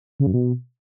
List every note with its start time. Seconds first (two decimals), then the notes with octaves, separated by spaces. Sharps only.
0.20 C#3
0.27 F#2
0.34 B2